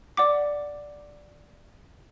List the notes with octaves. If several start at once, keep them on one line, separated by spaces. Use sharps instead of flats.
D5 F#5 D6